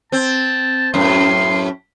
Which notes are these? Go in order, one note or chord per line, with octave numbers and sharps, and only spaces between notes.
C4 A5
F#2 A2 C6